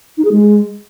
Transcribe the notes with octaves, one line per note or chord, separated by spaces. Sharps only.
D#4
G#4
G#3